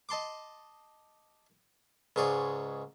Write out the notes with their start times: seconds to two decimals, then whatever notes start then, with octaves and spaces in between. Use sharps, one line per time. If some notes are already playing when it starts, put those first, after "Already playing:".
0.09 D#5 A5 C6 D6
2.16 C#2 G#2 G#4 C#5 D5